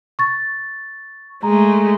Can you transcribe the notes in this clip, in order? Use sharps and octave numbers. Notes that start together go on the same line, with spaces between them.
C#6 A6
G#3 A3 A#5